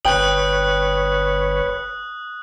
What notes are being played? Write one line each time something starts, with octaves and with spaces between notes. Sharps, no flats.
G1 B4 C#5 G5 D#6 F#6 F#7